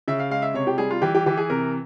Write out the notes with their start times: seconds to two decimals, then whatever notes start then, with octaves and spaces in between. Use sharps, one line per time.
0.08 C#3 E5
0.20 F5
0.31 G#3 F5
0.42 E5
0.54 C3 C#5
0.67 G4
0.78 G3 G#4
0.91 F4
1.02 E3 G4
1.15 G4
1.26 E3 G4
1.37 G#4
1.50 C3 A#4